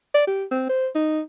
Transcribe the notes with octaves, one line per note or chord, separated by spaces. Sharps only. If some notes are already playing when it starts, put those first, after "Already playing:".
D5
G4
C4
C5
D#4